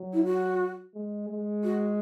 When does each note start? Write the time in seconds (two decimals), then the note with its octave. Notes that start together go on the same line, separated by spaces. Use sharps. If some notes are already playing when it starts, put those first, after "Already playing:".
Already playing: F#3
0.14 E4
0.24 F#4
0.94 G#3
1.30 G#3
1.64 F#4